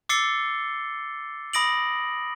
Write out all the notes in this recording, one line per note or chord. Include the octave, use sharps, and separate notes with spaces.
D6 E6 A6 C7 C#7 G7
B5 D#6 A#6 D7 F#7